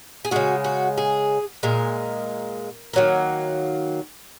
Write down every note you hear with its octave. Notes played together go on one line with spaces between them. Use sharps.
G#4
C#3 G#3 F#4
F#4
G#4
A#2 G#3 A#4
D#3 F#3 A#3